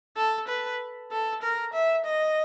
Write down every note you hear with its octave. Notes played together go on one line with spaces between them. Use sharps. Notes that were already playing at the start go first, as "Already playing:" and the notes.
A4
B4
A4
A#4
E5
D#5